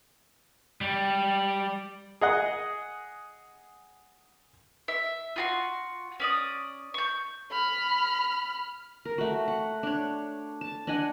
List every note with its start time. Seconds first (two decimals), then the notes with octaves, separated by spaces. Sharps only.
0.81 G3
2.21 G#4 D#5 F#5
4.88 E5
5.36 F4 F#4 C6
6.20 C#4 D5 D#6
6.94 C#6 G6
7.51 B5 F6
9.05 A#4
9.18 A3 F#4
9.48 F#5
9.83 D4 C#5
10.61 A5
10.87 D4 D#5 F#5 G#5